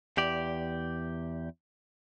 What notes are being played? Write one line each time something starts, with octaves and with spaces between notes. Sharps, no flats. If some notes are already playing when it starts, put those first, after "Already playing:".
E2 G4 D5